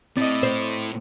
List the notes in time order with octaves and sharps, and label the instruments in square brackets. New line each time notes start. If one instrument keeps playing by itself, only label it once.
[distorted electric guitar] A2 [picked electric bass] C4 [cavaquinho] D5 D#5
[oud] C5